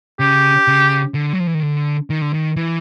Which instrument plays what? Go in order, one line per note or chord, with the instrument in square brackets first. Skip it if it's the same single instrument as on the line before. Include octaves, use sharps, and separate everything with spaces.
[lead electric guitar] C#3 [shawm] G4
[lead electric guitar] C#3
D3
F#3
F3
E3
D#3
D3
D#3
D3
D#3
E3